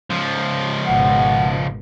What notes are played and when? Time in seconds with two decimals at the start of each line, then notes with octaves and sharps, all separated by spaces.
0.10 C#2 F3
0.86 G#1 B2 F#5